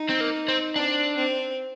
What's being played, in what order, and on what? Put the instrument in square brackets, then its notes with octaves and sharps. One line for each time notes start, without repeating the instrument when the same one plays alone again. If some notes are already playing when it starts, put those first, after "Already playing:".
Already playing: [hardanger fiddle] D#4
[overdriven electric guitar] C4
A#3
C4
[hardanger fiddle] C4 [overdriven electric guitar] D4
[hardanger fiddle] C4